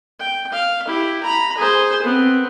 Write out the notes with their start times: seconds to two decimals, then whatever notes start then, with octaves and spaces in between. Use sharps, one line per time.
0.20 G5
0.53 F5
0.87 E4 G4
1.23 A#5 B5
1.58 G#4 C5
2.02 B3 C4